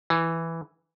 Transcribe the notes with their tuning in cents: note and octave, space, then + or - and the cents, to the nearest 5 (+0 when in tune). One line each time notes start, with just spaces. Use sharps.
E3 +0